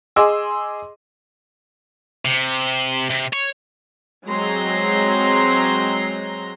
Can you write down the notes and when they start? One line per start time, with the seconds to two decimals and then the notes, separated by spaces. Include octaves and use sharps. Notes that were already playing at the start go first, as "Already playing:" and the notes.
0.16 G#4 D#5 G#5 C6 D6 E6
2.25 C3
3.09 C3
3.33 C#5
4.26 F#3 G#3 C4 A#5 C6